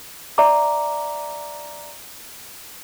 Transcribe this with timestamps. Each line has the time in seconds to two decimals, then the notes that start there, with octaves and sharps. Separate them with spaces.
0.38 D5 E5 A#5 D6